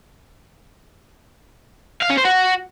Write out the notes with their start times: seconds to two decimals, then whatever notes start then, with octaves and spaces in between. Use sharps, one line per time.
2.02 F5
2.10 C#4
2.17 C5
2.25 F#4